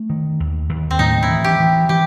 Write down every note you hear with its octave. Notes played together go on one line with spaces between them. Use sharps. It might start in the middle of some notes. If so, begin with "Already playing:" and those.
Already playing: A3
D#3
D#2
D#2
C4
A2 D#4
E4
E3
G4
E3
E3 G4